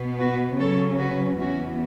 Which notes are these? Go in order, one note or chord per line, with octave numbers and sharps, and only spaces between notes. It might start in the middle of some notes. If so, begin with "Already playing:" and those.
Already playing: B2 B3
F#4 B4
C#3 F#3 C#4 A4 C#5
F#4 B4
E2 E3 B3 C#4 F#4